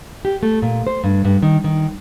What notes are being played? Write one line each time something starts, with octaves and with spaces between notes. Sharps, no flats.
G4
A3
A#2
C5
G2
G2
D#3
D#3